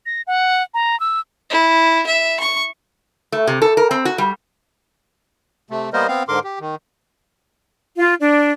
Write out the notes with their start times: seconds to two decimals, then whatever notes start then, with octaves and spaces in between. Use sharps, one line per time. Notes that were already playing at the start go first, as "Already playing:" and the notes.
0.06 A#6
0.27 F#5
0.74 A#5
1.00 E6
1.50 E4
2.06 E5
2.40 C#6
3.32 A3
3.47 C3
3.62 A4
3.77 A#4
3.91 C4
4.05 F#4
4.18 G3
5.70 C3 A3
5.93 G3 A#3 B3 A#4 C5 D#5
6.08 B3 C4 F5
6.28 G#2 D3 A#4 C6 D6
6.44 G4
6.60 D#3
7.98 F4
8.21 D4